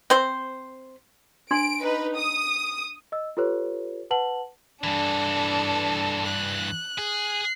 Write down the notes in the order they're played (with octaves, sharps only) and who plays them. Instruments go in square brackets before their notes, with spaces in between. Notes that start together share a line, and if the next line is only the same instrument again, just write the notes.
[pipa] C4 C5
[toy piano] D4 C6 [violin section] D7
[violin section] D#4 B4
D#6
[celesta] D#5 E6
F4 G4 A4 B4 C#5
B4 F#5 A5 F#7
[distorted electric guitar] G2 E3 [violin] D4 A4
[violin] F#6
[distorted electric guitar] G#4